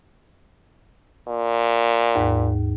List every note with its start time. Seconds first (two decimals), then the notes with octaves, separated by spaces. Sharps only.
1.28 A#2
2.15 D#2 G#2